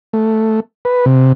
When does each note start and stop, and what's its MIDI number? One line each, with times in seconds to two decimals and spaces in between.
0.13 0.60 57
0.85 1.05 71
1.06 1.33 48